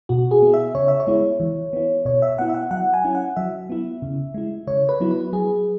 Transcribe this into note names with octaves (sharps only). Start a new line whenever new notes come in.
B2 F#4
G#4
B3 E4
E5
C#3 C#5
E5
C#5
G#3 B3 E4
E3
B3 E4
B2 C#5
E5
B3 E4 F#5
E5
F#5
F#3 F#5
G#5
C#4 E4
F#5
F#3 E5
B3 E4
C#3
G#3 E4
C#3 C#5
B4
F#3 B3 E4
B4
F#3 G#4